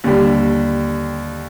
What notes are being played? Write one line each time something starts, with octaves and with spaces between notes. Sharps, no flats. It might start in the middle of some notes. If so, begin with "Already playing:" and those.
D#2 D3 G3